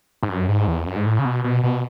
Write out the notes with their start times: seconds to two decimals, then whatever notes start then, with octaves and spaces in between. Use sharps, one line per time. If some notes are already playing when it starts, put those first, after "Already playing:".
0.23 G#2
0.29 F#2
0.49 G#2
0.67 E2
0.87 F#2
0.96 G#2
1.06 A2
1.19 C#3
1.25 B2
1.44 B2
1.63 B2